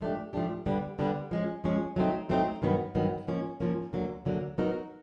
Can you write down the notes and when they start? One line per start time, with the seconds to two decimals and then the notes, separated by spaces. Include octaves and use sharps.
0.01 G#2 F3 A3 D4 G4
0.33 G#2 F3 A3 D4 G4
0.66 D3 G3 B3
0.99 D3 G3 B3
1.31 F3 G#3 C#4
1.64 F3 G#3 C#4
1.96 F#3 A3 C4 D#4
2.29 F#3 A3 C4 D#4
2.62 G2 D#3 F#3 B3
2.95 G2 D#3 F#3 B3
3.27 G#2 F3 A#3 C#4
3.60 G#2 F3 A#3 C#4
3.93 D2 D3 F#3 A#3
4.25 D2 D3 F#3 A#3
4.58 F#3 B3 D#4 F#4 A#4